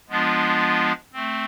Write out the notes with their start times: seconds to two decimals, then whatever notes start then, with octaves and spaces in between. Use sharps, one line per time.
0.09 F3 G#3 B3 D4 F4
1.13 A3 C4